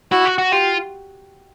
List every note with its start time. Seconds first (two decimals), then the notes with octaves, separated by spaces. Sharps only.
0.12 E4 F#4
0.25 F#4
0.38 F#4
0.51 F4 G4